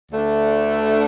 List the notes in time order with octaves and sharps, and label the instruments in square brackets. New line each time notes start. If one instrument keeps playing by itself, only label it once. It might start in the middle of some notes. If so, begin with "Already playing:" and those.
[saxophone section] D2 D3 A3 D4